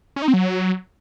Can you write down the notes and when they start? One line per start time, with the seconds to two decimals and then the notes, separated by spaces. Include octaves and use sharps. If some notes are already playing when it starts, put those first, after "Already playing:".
0.16 C#4
0.22 D#4
0.28 C4
0.34 F#3